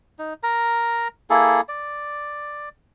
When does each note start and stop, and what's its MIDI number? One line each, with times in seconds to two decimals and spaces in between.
0.19 0.33 63
0.43 1.08 70
0.43 1.08 82
1.30 1.61 58
1.30 1.61 64
1.30 1.61 68
1.30 1.61 69
1.69 2.69 74